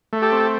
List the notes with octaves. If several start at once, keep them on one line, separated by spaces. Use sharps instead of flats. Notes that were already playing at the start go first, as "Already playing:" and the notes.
A3
G4 A4
C4